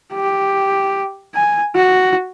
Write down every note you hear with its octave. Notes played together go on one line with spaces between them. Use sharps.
G4
G#5
F#4